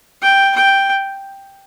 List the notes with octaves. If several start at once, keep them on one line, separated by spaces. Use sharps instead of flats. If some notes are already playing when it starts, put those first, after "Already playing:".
G5
G5